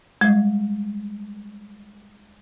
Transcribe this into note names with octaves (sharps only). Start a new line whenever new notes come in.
G3 G#3